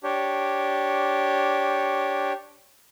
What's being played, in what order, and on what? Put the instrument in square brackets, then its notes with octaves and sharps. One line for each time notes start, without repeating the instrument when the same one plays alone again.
[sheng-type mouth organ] D4 G4 C#5